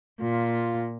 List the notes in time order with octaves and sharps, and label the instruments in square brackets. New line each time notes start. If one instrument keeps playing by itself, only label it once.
[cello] A#2 [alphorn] F4